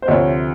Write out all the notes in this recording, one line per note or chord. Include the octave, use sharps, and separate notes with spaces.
C5
D2 C3 F3 C#5